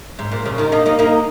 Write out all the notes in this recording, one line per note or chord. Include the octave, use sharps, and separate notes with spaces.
G#2
A#2
C#3
A#2 D#3
A#3 D#4
A#3 D#4
A#3 D#4